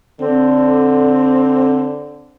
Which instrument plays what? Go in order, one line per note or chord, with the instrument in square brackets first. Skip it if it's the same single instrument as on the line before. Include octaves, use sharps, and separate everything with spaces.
[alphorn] D3 [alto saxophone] C4